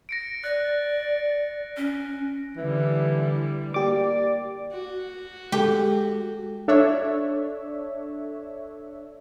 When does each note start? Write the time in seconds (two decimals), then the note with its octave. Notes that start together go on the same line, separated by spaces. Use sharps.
0.09 A#6 C#7 D7
0.44 D5 F#6 A#6
1.77 C#4
2.57 D3 E3 G3 E4
3.74 A#3 G4 D5 D6
4.72 F#4
5.52 G#3 G4 A4
6.68 D4 A4 C#5 E5